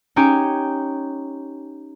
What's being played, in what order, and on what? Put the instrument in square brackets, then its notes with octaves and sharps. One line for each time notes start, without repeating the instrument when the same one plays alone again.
[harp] C#4 D#4 G4 G5 G#5